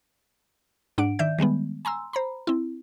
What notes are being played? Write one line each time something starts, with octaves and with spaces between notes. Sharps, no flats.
G#2 D4 F#5 D7
D#3 D5 E5 G6
D#3 G3 G#3 B3
G#5 A#5 C6 E6
C5 A#5 B5
C4 E4